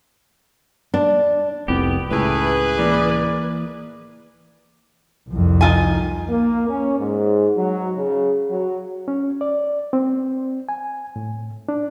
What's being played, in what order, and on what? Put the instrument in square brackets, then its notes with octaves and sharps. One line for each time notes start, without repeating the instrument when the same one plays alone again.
[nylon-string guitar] D4
[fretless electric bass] F1 C2 F2 [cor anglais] B3 [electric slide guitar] G4
[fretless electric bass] C#2 A2 [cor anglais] A3 [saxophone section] E4 G#4 B4
[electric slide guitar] E3 A#3 [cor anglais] D5
[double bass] C2 F2
[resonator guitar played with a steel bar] D#4 F4 G#5
[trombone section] A#3
C#4
G#2
F#3
C#3
F#3
[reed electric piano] C#4
D5
C4
G#5
A2
D4